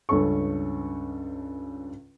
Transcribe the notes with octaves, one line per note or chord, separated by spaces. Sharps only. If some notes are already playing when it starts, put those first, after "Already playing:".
C#2 G2 C#4 A4 C#6